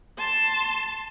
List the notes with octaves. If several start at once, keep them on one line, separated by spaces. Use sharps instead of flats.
A5 C6